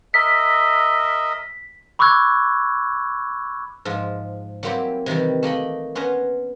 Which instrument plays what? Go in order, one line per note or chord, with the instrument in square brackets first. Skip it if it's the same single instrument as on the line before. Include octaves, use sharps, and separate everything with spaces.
[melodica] A#4 D#5 E5 [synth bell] B6
[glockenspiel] B5 C#6 D6 E6 F#6 G#6
[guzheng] G#2 F3 F4 E5 A#5
F#3 G3 A#3 C4 E4 G4
C3 D#3 E3 G3
A3 A#3 D#5 B5
B3 C#4 B4 C5 A#5